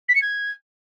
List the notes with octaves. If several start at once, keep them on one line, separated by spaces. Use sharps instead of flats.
B6
C#7
G#6